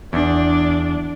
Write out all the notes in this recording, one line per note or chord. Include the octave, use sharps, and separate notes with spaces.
E2 D4